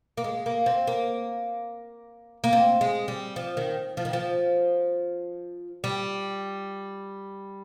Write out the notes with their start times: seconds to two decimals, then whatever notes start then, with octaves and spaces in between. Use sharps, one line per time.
0.17 A#3
0.24 G#3
0.46 A#3
0.66 C4
0.87 A#3
2.44 A#3
2.53 C4
2.81 G#3
3.08 G3
3.36 F3
3.57 D#3
3.97 F3
4.05 D#3
4.13 F3
5.84 G3